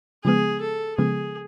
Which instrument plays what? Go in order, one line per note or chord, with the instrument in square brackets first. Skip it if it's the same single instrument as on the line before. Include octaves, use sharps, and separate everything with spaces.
[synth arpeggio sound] C#3 F3 G#3 B3 [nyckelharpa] G#4
[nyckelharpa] A4
[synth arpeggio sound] C#3 F3 G#3 B3 [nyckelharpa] G#4